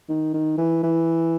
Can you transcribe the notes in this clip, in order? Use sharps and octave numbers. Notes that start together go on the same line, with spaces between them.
D#3
D#3
E3
E3